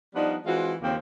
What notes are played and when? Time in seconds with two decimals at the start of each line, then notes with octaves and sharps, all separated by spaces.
0.14 F3 G3 B3 D4 D#4
0.46 E3 G#3 C4 F4 F#4
0.82 D#2 C#3 F3 A#3 C4